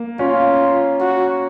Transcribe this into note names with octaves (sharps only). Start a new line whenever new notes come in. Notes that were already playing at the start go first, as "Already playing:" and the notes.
Already playing: A#3
C#4 F4
F#4